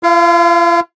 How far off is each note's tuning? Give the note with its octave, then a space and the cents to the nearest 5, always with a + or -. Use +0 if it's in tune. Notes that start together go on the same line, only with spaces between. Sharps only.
F4 -45 F5 +0